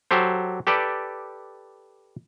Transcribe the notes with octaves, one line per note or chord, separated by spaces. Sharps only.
F#3 G4 A4 C5
G4 A4 B4 D5